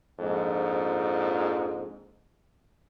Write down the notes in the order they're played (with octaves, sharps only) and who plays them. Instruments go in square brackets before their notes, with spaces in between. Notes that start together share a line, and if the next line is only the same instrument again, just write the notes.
[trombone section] A#1 F2 G#2